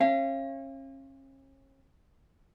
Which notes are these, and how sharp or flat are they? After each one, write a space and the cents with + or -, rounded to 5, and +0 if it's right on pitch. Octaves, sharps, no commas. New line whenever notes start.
C#4 -40 F5 -35